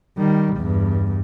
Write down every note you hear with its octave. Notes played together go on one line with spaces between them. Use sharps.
D#3 G3
E2 G2